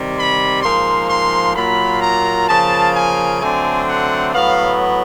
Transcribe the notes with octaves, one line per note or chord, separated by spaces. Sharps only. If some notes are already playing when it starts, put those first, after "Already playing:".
Already playing: C3 D#3 G3
B5
G#2 F3 A#3 C6
C6
A#2 F#3 A#3 B5
A#5
C#3 F3 A#3 A5
G#5
D3 F#3 A3 C4 G#5
F#5
A2 F#3 B3 F5